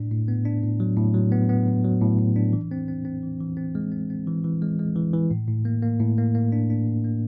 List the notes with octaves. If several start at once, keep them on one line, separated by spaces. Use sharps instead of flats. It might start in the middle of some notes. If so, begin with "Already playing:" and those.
Already playing: A2 D4
A2
B3
D4
A2
F#3
A2
F#3
B3
B3
A2
F#3
A2
A2
D4
E3
C4
C4
C4
E3
E3
C4
G#3
C4
C4
E3
E3
G#3
G#3
E3
E3
A2
A2
A#3
A#3
A2
A#3
A#3
D4
D4
A2
A#3